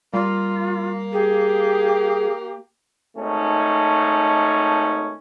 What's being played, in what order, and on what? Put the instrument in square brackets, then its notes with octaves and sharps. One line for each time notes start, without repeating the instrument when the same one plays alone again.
[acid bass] G3 [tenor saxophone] A#3 [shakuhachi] F4
[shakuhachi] G4 [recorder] G#4
[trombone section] G#1 A3 C#4 D#4